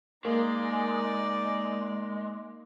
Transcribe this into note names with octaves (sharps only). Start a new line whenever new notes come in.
G#3 A#3 D#4 D5